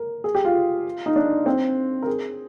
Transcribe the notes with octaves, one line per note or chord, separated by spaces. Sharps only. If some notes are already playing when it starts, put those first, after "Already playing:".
Already playing: A#4
G#4
G4
F4
D#4
D4
C4
A#4
G#4